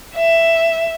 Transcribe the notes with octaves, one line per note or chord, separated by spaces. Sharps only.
E5